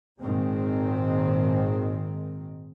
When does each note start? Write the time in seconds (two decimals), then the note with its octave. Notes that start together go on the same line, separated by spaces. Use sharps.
0.20 G#1 A#2 D#3 G#3 C4